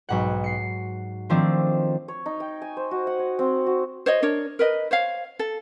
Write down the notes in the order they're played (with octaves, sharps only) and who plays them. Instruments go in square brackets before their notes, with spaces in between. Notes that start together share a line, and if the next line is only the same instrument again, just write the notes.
[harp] B1 G#2 F#5
C7 C#7
D#3 F3 A3 C4 D4
[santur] C#5
D#4
G5
G#5
C5
F#4
F#5
C#5
C4
F#4
[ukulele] C5 C#5 D#5
D4 A#4 C#5
A#4 B4 D#5
C5 C#5 F5
A4